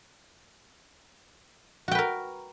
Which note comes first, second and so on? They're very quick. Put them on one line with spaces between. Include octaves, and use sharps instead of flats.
F#4 G5 B4 A#4